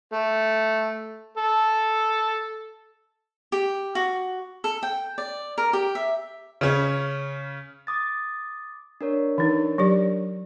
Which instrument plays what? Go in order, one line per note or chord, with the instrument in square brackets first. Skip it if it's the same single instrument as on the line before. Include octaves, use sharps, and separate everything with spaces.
[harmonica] A3
A4
[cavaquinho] G4
F#4
A4
G5
D5
A#4
G4
E5
[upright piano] C#3 C#4
[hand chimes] D6 D#6 A6
D4 A#4 C#5
[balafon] E3 D#4
F#3 G4 D5